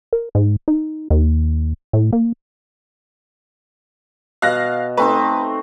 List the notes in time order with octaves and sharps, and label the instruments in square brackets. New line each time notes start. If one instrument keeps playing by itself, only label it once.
[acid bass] A#4
G#2
D#4
D#2
A2
A#3
[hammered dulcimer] B2 [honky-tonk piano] F5 F#6 A#6
[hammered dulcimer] A3 C4 D#4 [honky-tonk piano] B4